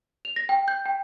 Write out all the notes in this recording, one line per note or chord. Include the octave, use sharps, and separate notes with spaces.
F7
A#6
G5
G6
G5